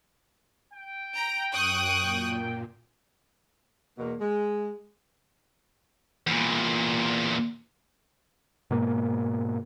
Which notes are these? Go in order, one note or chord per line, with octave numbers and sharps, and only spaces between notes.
G5
A#5
F#2 C#6 D#6 F#6
A#2
E2 B2 A#3
G#3
E2 A#2
G#2 B2 A#3